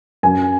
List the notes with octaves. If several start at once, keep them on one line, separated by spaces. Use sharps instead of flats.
F#2 G#5